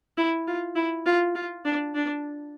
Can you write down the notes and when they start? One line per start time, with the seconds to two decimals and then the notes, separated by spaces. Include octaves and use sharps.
0.18 E4
0.47 F4
0.76 E4
1.06 F4
1.35 F4
1.65 D4
1.95 D4